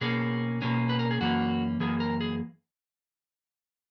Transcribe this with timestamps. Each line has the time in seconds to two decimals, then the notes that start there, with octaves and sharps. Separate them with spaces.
0.01 B2 A#3 C#4 G#4
0.62 B2 A#3 C#4
0.89 B4
0.99 A#4
1.11 G#4
1.21 F#2 E3 A#3 C#4 F#4
1.80 F#2 E3 A#3 G#4
2.00 A#4
2.21 G#4